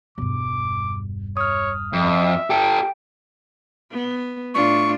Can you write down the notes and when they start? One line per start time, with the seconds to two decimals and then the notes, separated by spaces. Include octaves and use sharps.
0.18 E1 G2 D6
1.37 C#5 D#6 F6
1.93 F2 E5
2.50 G4 A4 G5 D7
3.92 B3
4.54 A2 D4 F4 C#6